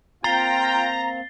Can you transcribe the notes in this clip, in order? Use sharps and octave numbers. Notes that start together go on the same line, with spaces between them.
A#3 C4 F4 G5 A#5 A6 C7 G7